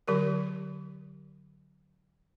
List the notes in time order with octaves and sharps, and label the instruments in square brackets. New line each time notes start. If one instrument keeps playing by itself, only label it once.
[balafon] D3 F#3 G4 A#4